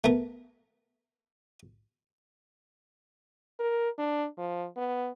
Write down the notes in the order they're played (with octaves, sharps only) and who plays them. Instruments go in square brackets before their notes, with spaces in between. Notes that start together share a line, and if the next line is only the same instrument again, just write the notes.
[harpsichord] A3 B3 A#4
[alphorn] A#4
D4
F3
B3